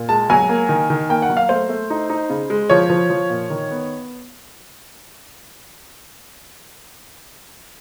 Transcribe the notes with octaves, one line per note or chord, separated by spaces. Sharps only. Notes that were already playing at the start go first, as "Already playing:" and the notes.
Already playing: A#2
G#3 A5
F#3 G#5
A#3
D#3
D#3
A#3 G5
F#5
F#3
F5
A3 C5
A3
D#4
D#4
C#3
G#3
F3 C#5
F3
F3
A#2
D#3
B3